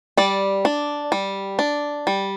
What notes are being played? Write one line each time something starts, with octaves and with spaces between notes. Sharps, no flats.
G3 D5
D4
G3
D4
G3